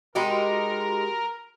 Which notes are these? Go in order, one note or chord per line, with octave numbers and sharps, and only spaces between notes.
G#3 D#4 F#4 G4 A#4 B5 C6